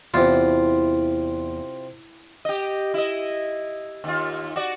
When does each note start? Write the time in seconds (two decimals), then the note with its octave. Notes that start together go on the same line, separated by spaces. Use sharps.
0.14 E2 C3 F4
2.45 G4 D#5
2.94 E4 D#5
4.04 D#2 F4
4.56 F#4 D5